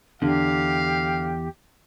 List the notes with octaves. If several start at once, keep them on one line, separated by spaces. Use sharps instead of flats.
E2 D3 G4 F5